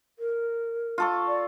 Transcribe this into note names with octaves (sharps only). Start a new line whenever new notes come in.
A#4
F4 A4 C#6
D5